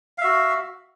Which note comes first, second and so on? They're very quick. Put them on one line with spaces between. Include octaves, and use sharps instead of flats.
F5 E5 F#4